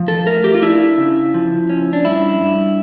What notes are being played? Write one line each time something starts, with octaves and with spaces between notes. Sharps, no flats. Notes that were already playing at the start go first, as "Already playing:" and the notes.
Already playing: F3
A4
A3 A#4
G4
F4
D4 E4
C#3
F3
C#4
D4
G2 E4
G2